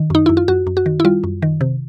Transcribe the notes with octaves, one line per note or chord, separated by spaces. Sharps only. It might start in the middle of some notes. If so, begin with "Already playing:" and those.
Already playing: D#3
F#2 D#4
F#2 E4
F4
F#2 F#4
F#2
F#4
D#3
E4
G3 F4
F#2
D#3
C3